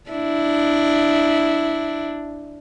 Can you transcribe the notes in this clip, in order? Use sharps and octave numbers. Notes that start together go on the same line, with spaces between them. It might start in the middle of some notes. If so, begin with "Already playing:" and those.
D4 E4